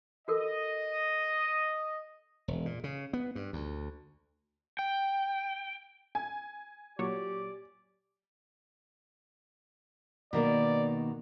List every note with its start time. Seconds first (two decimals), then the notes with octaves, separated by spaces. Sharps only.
0.28 F#4 A4 A#4 D#5
2.48 E1
2.65 A#2
2.84 C#3
3.13 B3
3.35 G2
3.53 D2
4.79 G5
6.15 G#5
6.99 A#2 F#3 G4 C#5 D5
10.33 B2 D#3 A#3 D5